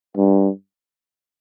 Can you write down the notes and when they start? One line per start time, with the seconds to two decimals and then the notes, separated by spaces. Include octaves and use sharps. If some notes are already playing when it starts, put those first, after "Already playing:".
0.17 G2